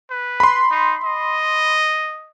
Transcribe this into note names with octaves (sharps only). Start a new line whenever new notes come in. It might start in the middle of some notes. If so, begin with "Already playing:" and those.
B4
B5 C6
D#4
D#5